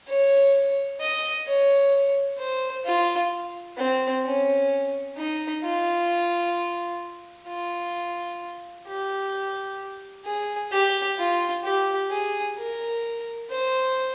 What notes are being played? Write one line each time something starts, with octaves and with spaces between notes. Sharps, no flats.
C#5
D#5
C#5
C5
F4
C4
C#4
D#4
F4
F4
G4
G#4
G4
F4
G4
G#4
A#4
C5